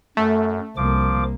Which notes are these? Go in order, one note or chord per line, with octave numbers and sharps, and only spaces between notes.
F#2 A3
C2 F3 A#3 D6